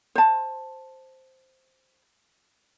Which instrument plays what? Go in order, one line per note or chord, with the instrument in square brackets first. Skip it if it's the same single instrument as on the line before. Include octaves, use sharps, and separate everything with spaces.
[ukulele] C5 A5